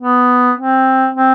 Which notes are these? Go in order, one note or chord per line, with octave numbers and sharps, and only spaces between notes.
B3
C4
C4